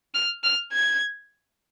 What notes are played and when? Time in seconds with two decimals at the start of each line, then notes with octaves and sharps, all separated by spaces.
0.15 F6
0.44 F6
0.73 G#6